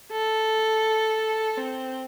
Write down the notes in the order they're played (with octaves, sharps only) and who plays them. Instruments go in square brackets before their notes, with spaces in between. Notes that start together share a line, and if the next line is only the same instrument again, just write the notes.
[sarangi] A4
C4